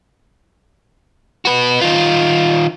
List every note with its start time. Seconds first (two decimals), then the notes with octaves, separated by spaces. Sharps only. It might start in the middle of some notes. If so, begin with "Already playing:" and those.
1.45 F#4 B4
1.81 D#3 F4